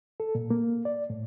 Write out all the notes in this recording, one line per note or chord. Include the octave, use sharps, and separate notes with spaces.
A4
A#2
A#3
D5
A2